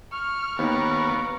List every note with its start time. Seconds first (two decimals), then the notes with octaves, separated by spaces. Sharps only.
0.12 C#6 F6
0.59 D#2 B3 A#4